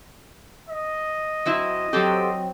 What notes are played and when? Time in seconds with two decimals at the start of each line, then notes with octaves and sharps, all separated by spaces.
0.69 D#5
1.46 F#3 C4 E4
1.93 F#3 C4 G4 A4